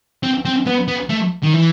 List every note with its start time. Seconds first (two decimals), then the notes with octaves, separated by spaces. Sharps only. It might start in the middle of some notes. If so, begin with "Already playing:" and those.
0.23 C4
0.45 C4
0.66 B3
0.88 B3
1.10 A3
1.43 D#3
1.54 E3